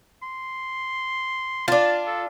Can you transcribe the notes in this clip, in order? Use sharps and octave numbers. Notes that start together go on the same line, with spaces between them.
C6
D4 F4 A5
A4